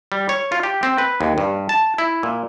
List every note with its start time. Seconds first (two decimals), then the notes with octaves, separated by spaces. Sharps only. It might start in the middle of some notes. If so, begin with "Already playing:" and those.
0.12 G3
0.29 C#5
0.52 F4
0.63 G4
0.83 C4
0.98 B4
1.21 D#2
1.38 G2
1.69 A5
1.98 E4
2.23 A#2